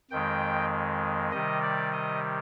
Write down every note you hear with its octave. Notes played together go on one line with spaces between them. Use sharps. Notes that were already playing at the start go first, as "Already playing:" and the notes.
F2 D#3 G#3 G5
C3 D#3 G3 D#5
D5
D#5